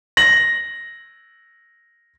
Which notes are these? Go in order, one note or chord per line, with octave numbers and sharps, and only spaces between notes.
A#6 F#7